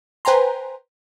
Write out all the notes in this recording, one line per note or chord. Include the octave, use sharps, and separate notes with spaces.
B4 C5 G5 G#5 A#5 C6